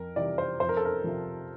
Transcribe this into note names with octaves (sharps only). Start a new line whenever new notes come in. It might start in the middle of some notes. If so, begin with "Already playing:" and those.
Already playing: F2 A#4
C3 E3 G3 D5
C5
F2 C5
A#4
A4
A#4
C3 F3